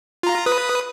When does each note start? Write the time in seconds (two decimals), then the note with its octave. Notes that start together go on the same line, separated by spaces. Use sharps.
0.23 F4 A#5
0.46 B4 D#6